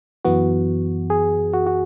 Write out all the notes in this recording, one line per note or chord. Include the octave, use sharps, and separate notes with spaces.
F#2 E3 B3 F#4
G#4
F#4
F#4